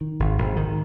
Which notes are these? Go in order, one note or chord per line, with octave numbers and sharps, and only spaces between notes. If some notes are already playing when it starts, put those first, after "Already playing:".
D#3
G#1
G#1
D#3